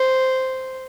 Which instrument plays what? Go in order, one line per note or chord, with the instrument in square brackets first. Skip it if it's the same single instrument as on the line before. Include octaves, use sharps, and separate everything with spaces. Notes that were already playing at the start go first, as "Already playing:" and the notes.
Already playing: [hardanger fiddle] C5